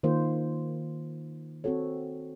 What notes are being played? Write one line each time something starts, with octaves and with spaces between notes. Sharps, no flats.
D#3 A#3 F4 C5
C4 F#4 A4 C#5